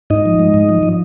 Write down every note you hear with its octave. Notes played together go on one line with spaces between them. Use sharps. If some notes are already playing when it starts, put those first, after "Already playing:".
G#2 D#4 D#5
F3
G#3
G#2
F3
F3